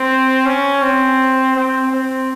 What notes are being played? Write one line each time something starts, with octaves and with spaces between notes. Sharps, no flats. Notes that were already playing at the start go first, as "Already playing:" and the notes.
Already playing: C4
C#4
C4
C4
C4